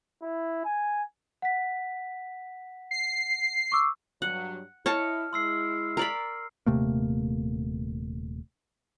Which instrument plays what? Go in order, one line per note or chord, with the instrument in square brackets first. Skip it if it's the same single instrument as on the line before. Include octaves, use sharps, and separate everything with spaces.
[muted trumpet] E4
G#5
[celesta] F#5 B6
[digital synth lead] C7
[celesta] C#6 D6 E6
[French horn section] G2 F#3 [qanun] F#5
[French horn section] E4 [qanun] C#5 D#5 A5 [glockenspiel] F6
[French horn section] G#3 E4 [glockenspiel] C6 E6 C7
[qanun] A#4 D5 B5
[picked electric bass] D#1 C3 A3 A#3